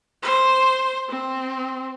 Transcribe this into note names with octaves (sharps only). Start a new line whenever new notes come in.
C5
C4